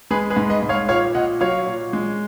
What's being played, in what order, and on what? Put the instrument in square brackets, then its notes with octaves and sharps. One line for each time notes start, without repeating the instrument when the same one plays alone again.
[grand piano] G#3 G#4 B4
G#4 B4
G#2
B4 D#5
G#2
C#5 F5
A#2 C#5 F5
A#2 D#5 F#5
F#3 C#5 F5
A#2
G#3